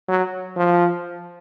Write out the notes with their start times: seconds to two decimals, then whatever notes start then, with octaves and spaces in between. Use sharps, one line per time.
0.08 F#3
0.56 F3